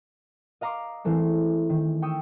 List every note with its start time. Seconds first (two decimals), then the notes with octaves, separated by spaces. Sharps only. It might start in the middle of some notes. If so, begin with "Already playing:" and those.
0.61 D#5 F5 A#5 C6 D6
1.05 E3 G#3 A3 C4
1.69 D#3
2.02 G5 C#6 D#6 E6